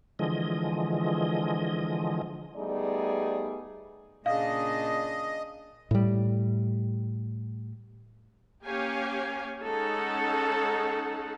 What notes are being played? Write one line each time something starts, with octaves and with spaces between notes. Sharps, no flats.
D3 E3 F3 G#3 D#5
G3 A3 B3 D#4 G#4 D5
A#2 C#3 D4 D#5 F5
A2 G3
A#3 C#4 G4 C#5 F5 G#5
G#3 C#4 D#4 A4 F#5